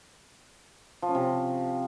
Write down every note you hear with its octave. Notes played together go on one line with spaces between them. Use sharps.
F3
C#4
C3